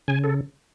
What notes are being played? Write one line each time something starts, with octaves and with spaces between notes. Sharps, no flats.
C#3 G#5
A4